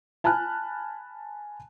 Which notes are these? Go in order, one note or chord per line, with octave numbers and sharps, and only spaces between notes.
G#5 A5 B5 F6 F#6